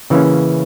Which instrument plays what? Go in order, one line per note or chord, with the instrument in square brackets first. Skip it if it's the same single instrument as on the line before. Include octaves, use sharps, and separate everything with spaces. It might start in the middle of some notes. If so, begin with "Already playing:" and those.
[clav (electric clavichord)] C#3 E3 A#3 C#4